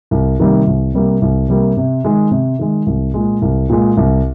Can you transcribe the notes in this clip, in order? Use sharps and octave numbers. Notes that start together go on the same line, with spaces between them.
C2
C3 D#3 G3 A#3
C2
C3 G3 A#3
C2
C3 G3 A#3
C3
D#3 G#3
C3
D#3 G#3
C2
A#2 G#3
C2
A#2 G#3
C2